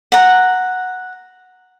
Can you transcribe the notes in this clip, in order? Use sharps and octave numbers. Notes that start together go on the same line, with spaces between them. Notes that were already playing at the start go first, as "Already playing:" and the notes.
F#5 A#5